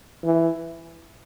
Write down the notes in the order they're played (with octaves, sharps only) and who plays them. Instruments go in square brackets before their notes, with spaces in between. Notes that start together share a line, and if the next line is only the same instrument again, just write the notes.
[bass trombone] E3